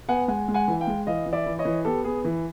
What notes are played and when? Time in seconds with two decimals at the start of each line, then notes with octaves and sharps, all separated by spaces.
0.09 B3 F#5 G#5
0.28 G#3 F#5 G#5
0.48 G#3
0.54 F#5 G#5
0.68 E3
0.81 F5 G5
0.87 G#3
1.07 E3 D#5 F5
1.26 E3
1.33 D5 E5
1.46 E3
1.59 C#5 D#5
1.65 E3
1.85 B3 G4 A4
2.04 B3 G#4
2.24 E3